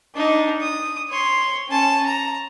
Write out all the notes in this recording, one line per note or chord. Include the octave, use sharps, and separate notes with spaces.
D4 D#4
D#6
C#5 C6
C#4 A5
A#5